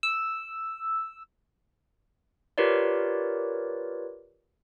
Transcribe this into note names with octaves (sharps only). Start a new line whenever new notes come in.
E6
F4 G4 A#4 B4 C#5 D5